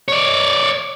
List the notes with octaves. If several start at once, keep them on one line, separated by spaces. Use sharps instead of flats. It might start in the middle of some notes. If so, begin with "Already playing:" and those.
C#5 D5